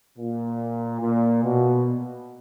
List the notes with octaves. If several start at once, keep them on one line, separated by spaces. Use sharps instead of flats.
A#2
A#2
B2